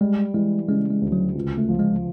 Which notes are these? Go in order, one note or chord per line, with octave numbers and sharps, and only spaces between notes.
G3 G#3
E3 G#3
C#3 G#3
G#3
D2
F#3
C#2
A3
F3
G#3